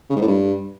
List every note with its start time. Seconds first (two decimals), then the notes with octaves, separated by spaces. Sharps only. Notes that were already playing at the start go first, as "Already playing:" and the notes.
0.10 C#3
0.16 G#2
0.22 A2
0.28 G2